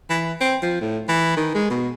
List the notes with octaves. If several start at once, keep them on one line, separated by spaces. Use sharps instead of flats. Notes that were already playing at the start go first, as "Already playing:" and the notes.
E3
C4
F3
A2
E3
D#3
G#3
B2